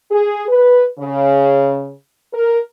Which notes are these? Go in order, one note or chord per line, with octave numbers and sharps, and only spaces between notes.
G#4
B4
C#3
A#4